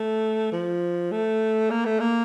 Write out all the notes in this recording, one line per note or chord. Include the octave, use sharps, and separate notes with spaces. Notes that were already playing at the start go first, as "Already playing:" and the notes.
Already playing: A3
F3
A3
A#3
A3
A#3